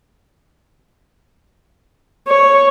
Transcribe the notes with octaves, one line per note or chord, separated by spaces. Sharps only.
C#5